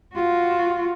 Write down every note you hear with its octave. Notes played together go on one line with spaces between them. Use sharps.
F4 F#4